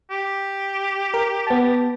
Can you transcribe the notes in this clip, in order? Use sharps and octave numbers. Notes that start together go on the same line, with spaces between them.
G4
A#4
B3 A5